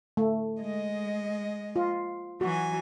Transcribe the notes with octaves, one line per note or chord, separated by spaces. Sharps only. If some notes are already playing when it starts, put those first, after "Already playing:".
A3
G#3 D#5
F4
E3 F#3 F#4 G#5